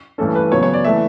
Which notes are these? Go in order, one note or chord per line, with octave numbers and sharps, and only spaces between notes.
G2 E3 A3 C#4 A4
B4
C#3 F#3 B3 C#5
C#5
D5
E3 A3 E5